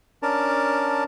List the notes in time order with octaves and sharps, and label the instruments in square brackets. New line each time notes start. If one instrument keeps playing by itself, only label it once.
[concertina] C#4 D4 A#4 A5